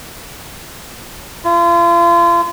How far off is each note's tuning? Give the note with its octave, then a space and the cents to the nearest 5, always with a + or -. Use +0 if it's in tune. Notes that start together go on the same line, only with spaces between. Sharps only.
F4 -35